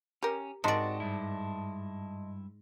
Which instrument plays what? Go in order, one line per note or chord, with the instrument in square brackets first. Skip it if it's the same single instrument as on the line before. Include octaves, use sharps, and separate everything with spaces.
[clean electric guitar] C#4 [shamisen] G4 A#4
[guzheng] G#2 D5 [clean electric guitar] C4 F#4 [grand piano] D#5 A5 C6
[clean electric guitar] G2 E4